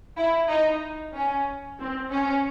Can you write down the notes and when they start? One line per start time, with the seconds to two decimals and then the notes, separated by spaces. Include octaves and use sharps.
0.17 E4
0.49 D#4
1.14 C#4
1.78 C4
2.11 C#4